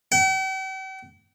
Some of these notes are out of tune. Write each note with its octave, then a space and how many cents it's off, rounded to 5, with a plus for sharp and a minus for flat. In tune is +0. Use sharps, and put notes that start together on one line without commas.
G5 -45